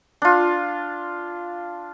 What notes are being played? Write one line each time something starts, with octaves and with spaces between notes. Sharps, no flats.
D4 F4